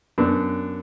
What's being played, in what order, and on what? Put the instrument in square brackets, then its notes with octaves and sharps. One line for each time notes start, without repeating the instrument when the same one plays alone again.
[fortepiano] F#2 B3 D4